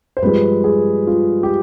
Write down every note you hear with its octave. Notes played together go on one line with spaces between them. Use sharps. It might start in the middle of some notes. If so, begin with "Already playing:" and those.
C5
G2 F3 G#3 B4
G#4
F4
G4